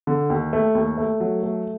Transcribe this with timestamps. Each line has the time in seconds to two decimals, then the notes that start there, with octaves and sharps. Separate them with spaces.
0.07 D3
0.30 D#2
0.53 A3
0.75 D#2
0.98 A3
1.20 F#3
1.43 A3